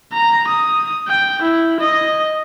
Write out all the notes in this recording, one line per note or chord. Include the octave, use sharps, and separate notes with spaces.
A#5
D#6
G5
E4
D#5